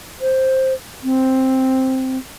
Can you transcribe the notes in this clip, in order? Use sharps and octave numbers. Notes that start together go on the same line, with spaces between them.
C5
C4